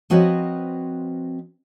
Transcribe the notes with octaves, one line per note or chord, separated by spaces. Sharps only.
F3 C4 F#4 B4 C#5 D#5